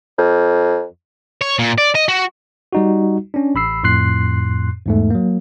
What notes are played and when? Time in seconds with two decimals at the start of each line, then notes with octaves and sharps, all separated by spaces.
0.18 F2
1.41 C#5
1.59 A#2
1.78 D5
1.95 D#5
2.08 F#4
2.73 G3 D#4 F#4
3.34 C#4 D4
3.55 A1 B5 E6 C7
3.83 F2 A2 C6 F#6 C7
4.86 E2 G#2 A3
5.10 F#3 A#3